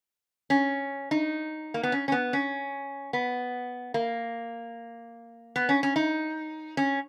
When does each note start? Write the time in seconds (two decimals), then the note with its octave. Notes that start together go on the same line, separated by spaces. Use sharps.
0.50 C#4
1.11 D#4
1.74 A#3
1.83 B3
1.92 C#4
2.08 C#4
2.12 B3
2.33 C#4
3.13 B3
3.94 A#3
5.56 B3
5.69 C#4
5.83 C#4
5.96 D#4
6.77 C#4